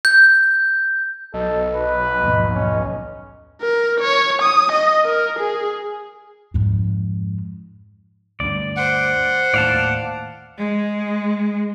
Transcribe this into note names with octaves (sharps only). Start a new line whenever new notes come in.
G6
B1 A4 D#5
B4
A#1 D#2 G#2
C#4
A#4
C#5
D#6
D#5
A#4
G#4
F2 G#2
D2 G2 D5
C5 F#5
D#2 A2 D5 F5 A5
G#3